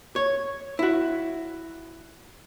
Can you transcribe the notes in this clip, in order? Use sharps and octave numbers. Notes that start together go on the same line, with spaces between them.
C#5
E4 F#4